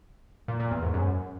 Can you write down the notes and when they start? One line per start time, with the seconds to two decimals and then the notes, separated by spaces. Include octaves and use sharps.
0.48 A#2
0.60 A#2
0.71 E2
0.83 G#2
0.94 F#2